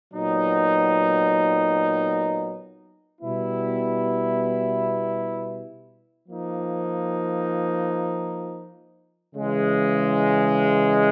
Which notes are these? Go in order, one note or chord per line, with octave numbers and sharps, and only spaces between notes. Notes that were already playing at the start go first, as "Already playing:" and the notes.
A#2 F#3 B3 D#4
B2 G3 B3 E4
F3 A#3 D#4
C#3 E3 G#3